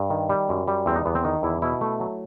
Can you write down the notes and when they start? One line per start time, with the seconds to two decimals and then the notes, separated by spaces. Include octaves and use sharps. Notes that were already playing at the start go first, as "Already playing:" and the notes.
Already playing: G2
0.10 D#3
0.29 G3
0.49 F#2
0.67 G3
0.86 E2 C4
0.96 D#4
1.06 E2 B3
1.15 C4
1.25 D#3 D#4
1.43 E2 E4
1.62 B2 E4
1.81 A3
2.00 F#3